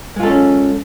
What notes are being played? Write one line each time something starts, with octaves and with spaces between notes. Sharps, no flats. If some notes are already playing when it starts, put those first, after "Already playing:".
G#3 C#4 F4 A4